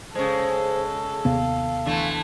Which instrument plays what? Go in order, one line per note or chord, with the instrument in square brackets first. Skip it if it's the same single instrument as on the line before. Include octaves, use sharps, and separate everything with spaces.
[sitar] C#3 G#3 [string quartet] A4 [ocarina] C5
[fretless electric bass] D#2 C3 B3 [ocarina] F5
[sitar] D3 E3 A3